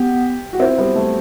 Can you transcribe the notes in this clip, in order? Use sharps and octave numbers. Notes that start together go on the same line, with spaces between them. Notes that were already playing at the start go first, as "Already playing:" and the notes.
Already playing: B3 G4
F#4
C4 E4
G3 B3
A3